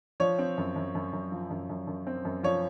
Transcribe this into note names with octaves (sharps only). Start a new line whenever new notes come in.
F3 C#5
C4
F#2
F#2
F#2
F#2
F3
F#2
F#2
F#2
C4
F#2
F3 C#5